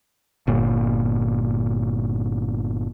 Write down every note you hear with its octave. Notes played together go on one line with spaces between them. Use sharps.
G1 A#2